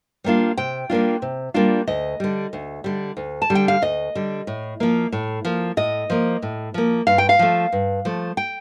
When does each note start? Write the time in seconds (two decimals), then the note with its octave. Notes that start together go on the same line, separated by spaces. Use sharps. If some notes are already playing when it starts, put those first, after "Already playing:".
0.24 G3 A#3 D4 F4
0.57 C3 G5
0.90 G3 A#3 D4 F4
1.22 C3
1.54 G3 A#3 D4 F4
1.87 D2 D#5
2.20 D3 G3
2.53 D2
2.84 D3 G3
3.17 D2
3.42 A5
3.50 D3 G3
3.55 G5
3.68 F5
3.82 D2 D#5
4.15 D3 G3
4.47 A2
4.80 F3 A#3
5.12 A2
5.45 F3 A#3
5.77 A2 D#5
6.10 F3 A#3
6.42 A2
6.74 F3 A#3
7.07 G2 F5
7.18 G5
7.29 F5
7.39 F3 A3
7.72 G2
8.05 F3 A3
8.37 G5